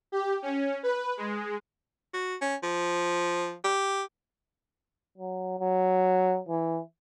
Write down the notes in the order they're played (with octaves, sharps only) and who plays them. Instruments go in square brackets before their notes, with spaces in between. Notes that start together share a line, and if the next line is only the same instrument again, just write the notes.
[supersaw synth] G4
C#4
B4
G#3
[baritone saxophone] F#4
C#4
F3
G4
[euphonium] F#3
F#3
E3